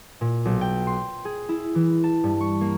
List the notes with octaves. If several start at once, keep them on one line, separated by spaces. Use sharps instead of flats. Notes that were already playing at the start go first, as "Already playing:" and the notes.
A#2
B1
G5
C6
G#4
E4
E3
A5
G2
C#6
A#3